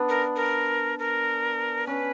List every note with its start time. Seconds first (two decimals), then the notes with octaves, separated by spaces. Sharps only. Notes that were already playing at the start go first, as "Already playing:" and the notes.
Already playing: B3 D4
0.09 A#4
0.36 A#4
0.99 A#4
1.87 C#4 B4